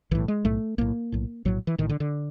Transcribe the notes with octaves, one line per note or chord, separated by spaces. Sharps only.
B1 A2 E3
G#3
B1 A2 A3
B1 A2 A#3
B1 A2
A#1 A2 F#3
E3
A#1 A2 D#3
D3
D3